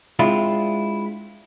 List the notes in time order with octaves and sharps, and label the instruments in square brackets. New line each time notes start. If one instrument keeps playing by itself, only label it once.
[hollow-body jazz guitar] G#3 C4 D4 E4 F4